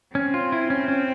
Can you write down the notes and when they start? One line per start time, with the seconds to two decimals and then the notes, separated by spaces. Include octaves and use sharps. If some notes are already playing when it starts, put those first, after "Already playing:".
0.15 C4 C#4
0.34 F4
0.52 E4
0.70 C#4
0.88 C#4